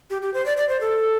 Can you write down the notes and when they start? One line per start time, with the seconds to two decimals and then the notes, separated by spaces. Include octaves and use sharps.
0.10 G4
0.22 G4
0.34 C5
0.46 D5
0.57 D5
0.69 C5
0.81 A4